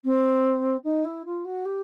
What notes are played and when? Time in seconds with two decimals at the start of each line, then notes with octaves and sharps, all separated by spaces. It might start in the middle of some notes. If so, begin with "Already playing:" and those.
0.04 C4
0.84 D#4
1.04 E4
1.25 F4
1.44 F#4
1.65 G4